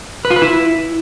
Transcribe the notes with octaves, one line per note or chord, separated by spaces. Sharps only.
B4
F4
B4
E4